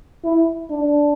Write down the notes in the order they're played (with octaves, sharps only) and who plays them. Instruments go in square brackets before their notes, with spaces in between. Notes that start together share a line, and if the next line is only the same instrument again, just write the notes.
[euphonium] E4
D4